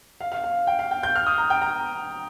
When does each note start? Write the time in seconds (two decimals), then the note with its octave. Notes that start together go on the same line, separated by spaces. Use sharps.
0.21 F5
0.32 F5
0.44 F5
0.67 G5
0.79 F5
0.91 G5
1.03 G6
1.15 F6
1.26 D#6
1.38 A#5
1.50 G5
1.62 A#5